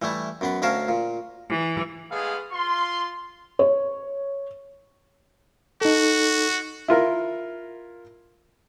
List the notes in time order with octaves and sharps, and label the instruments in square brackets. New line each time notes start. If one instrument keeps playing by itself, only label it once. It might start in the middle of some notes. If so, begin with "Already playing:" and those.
[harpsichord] E3 G3 A3 E4
F#2 B3 B4
D2 C#4 A#4 F5 A5
A#2
[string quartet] E3
[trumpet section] G#3 A3 B3 G#4 F5
F4 C6
[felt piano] C#5
[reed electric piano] D#4 A4 [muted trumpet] F#4
[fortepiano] E4 F4 A#4